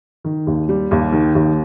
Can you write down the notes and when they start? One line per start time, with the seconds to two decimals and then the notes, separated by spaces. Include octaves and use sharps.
0.24 D#3
0.47 D#2
0.69 G3
0.91 D#2
1.13 D#3
1.35 D#2